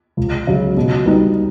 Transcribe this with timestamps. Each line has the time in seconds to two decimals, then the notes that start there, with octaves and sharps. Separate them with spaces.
0.17 C#2
0.47 C#3 F#3
0.77 B2
1.06 G3 B3 D#4